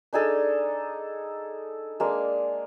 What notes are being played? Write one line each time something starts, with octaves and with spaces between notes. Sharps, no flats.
D4 D#4 G#4 A4
G#3 A#3 D4